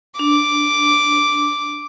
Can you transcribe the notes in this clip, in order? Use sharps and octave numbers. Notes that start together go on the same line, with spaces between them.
D4 D6